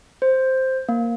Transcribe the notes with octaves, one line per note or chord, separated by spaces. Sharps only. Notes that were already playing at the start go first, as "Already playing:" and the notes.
C5
A#3